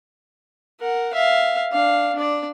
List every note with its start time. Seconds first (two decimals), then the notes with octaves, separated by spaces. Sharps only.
0.80 A#4 F#5
1.13 E5 F5
1.72 D4 F5
2.15 D4 D5